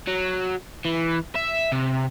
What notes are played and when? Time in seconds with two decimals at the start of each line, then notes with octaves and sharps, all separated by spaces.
0.08 F#3
0.85 E3
1.36 E5
1.72 C3